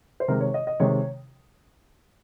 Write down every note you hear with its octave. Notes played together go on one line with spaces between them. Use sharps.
C5
C3 D#3 G#3 A#4
C#5
D#5
D#5
C3 D#3 G#3 C#5